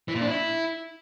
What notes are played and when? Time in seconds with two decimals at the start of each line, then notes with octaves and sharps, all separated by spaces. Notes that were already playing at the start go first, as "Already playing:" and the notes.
0.08 E3
0.15 A#2
0.21 D4
0.28 E4